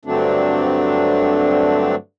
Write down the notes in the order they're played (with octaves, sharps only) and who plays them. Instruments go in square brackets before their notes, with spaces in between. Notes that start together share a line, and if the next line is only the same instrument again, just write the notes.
[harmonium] G2 D3 F#3 A3 C4 D4